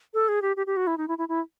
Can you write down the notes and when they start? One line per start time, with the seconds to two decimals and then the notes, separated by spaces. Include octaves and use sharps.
0.14 A4
0.28 G#4
0.42 G4
0.56 G4
0.67 G4
0.77 F#4
0.87 E4
0.98 D#4
1.08 E4
1.18 E4
1.29 E4